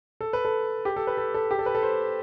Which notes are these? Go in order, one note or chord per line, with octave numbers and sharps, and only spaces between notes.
A4
B4
A4
G4
A4
B4
A4
A4
G4
A4
B4
A4
C5